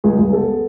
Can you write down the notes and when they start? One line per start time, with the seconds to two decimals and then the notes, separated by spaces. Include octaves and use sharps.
0.04 C#2 G#4
0.19 C#2
0.33 B3 A4